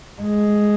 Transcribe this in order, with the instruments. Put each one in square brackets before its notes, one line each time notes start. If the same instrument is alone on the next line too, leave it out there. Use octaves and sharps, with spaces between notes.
[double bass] G#3